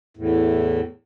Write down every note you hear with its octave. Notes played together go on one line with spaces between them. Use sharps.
E2 A2